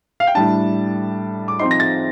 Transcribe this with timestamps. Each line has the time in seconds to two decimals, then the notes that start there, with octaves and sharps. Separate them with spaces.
0.20 F5
0.27 G5
0.35 A2 G3 D4 A5
1.48 D6
1.59 F3 C4 D#4 C6
1.71 A#6
1.80 A6